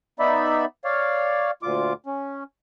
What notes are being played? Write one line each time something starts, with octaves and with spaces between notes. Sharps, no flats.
B3 D#4 D5 E5 B5
C#5 D5 F5
D2 A#2 F4 D6
C#4